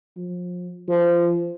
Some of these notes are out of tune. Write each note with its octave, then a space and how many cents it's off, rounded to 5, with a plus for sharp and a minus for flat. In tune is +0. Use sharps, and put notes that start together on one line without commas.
F3 +35
F3 -20